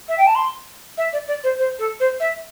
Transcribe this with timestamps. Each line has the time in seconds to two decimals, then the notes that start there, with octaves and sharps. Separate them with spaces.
0.09 E5
0.18 G5
0.27 A5
0.35 C6
0.98 E5
1.13 D5
1.28 D5
1.44 C5
1.59 C5
1.79 A4
2.00 C5
2.20 E5